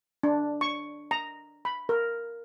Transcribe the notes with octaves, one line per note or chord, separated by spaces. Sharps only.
D4
C#6
A#5
B5
A#4